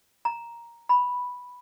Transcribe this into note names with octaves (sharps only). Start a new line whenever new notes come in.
A#5
B5